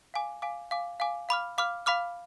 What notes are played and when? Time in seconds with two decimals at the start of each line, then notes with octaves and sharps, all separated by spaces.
0.14 F5 G#5 D6
0.42 F5 G#5 D6
0.71 F5 G#5 D6
1.00 F5 G#5 D6
1.29 F5 B5 D6 F6
1.58 F5 B5 D6 F6
1.86 F5 B5 D6 F6